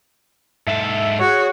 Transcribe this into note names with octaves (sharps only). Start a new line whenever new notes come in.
G#2 A4 E5
F#4 G#4 C#5